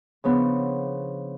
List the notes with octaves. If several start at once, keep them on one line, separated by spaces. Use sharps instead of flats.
C#3 F3 B3 D4